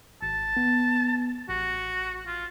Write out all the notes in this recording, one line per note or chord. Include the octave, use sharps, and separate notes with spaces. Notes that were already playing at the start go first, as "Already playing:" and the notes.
G#1 A5
B3
A1 F#4
F4